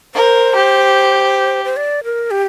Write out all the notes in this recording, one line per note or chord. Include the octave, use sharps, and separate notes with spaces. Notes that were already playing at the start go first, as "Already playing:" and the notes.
A#4 C5
G4
C5
D5
A#4
G4